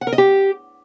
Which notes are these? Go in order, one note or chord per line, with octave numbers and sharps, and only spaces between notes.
F#5
A#4
D#5
G4